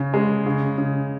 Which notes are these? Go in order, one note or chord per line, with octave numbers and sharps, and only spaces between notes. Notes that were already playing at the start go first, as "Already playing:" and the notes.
Already playing: C#3
G#3
C#3
C#3